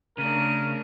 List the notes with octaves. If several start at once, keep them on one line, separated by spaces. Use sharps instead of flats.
C#3 A3 D4 A#4 D#7